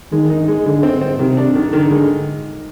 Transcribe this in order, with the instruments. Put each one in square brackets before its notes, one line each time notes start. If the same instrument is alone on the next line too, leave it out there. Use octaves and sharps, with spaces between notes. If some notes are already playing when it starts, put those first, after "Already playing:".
[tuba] D#3 [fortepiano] G#3
[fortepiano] D#4
G#3
[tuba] D3 [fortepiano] G#3
[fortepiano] C4
C4
[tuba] C3 [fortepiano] D#3
[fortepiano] D4
D#3
[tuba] D3 [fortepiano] D#3
[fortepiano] G#3